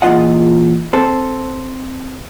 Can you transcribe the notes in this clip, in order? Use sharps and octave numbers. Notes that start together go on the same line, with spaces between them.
E2 A#2 C#3 F4 D#5 F#5
C4 A4